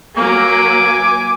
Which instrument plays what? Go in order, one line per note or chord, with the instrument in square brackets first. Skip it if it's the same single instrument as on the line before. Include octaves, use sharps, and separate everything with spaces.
[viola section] F#3 A#3 [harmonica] G#5 D6